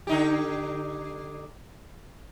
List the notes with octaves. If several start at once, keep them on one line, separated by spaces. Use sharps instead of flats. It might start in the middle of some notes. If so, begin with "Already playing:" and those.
D3 D#4 G4